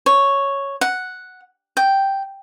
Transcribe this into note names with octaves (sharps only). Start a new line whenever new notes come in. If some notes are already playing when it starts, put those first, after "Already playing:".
C#5
F#5
G5